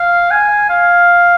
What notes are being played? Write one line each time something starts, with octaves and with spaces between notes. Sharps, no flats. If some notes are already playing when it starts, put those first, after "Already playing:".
Already playing: F5
G#5
F5